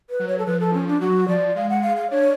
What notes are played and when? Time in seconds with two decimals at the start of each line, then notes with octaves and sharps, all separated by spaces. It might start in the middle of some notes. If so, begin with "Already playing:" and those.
0.10 B4
0.20 F#3
0.28 C#5
0.38 A4
0.46 F3 B4
0.60 A4
0.74 C#4
0.88 D4
1.01 F#3 F#4
1.28 F3 D5
1.56 G#3 F5
1.69 F#5
1.83 F5
1.97 F5
2.10 D4 C#5